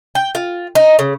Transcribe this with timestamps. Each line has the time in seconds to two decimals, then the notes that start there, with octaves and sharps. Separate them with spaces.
0.15 G5
0.35 F4
0.75 D#4
0.99 C#3